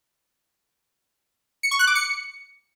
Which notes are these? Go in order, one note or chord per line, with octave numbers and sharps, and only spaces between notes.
C#7
C#6
F#6
D6
C#7